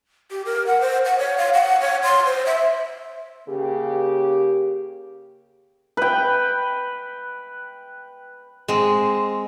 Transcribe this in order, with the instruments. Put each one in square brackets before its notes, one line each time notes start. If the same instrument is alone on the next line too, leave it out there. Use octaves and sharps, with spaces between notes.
[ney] G4
A#4
F#5
C5
F#5
C#5
F5
F#5
C#5
C6
C5
E5
[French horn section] C#3 A#3 G4
[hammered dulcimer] B4 G5
[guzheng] G#3 C4